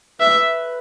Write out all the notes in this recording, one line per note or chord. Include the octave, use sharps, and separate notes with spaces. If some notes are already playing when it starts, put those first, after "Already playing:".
B4 E5